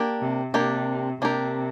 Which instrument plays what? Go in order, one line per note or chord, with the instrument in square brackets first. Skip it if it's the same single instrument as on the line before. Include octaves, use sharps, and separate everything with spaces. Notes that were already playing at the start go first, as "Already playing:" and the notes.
Already playing: [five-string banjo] A#3 D4 G4 A#4
[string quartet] C3
[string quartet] C3 [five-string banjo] A#3 D4 G4 A#4
[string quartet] C3 [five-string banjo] A#3 D4 G4 A#4